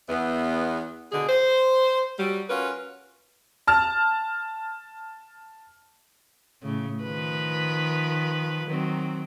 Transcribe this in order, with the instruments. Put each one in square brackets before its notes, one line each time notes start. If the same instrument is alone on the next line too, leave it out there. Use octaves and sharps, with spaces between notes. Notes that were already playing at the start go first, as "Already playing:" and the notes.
[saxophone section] E2 B3
B2 D3 G#4
C5
F#3 G3
C#4 F4 F#4 A#4 B4
[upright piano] A5 F6
[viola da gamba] A2 C#3
D#3 F3 B4
D#3 F#3 C4